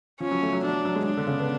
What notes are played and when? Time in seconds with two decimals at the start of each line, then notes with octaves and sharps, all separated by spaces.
0.20 F3 C#4
0.31 F#3
0.42 A3
0.53 F#3
0.63 F#3 D4
0.85 F#3
0.96 G#3
1.06 D4
1.17 D3
1.27 C#3
1.39 B3